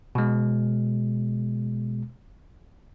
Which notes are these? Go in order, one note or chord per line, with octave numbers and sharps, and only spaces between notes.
B2 G#3